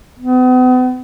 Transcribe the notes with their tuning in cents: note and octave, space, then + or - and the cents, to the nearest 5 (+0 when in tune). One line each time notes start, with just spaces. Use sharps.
B3 +40